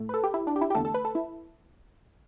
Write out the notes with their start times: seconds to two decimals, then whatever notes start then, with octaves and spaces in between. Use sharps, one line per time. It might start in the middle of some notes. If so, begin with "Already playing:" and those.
Already playing: A2 A3
0.09 B4
0.14 A4
0.23 G4
0.34 E4
0.47 D4
0.56 G4
0.61 E4
0.70 G4
0.75 E2 D3 A3 A4
0.85 A4
0.94 B4
1.05 A4
1.15 E4